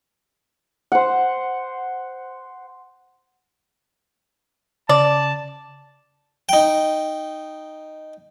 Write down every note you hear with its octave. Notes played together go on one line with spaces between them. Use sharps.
C5 F#5
C#3 D5 A5
D#4 G5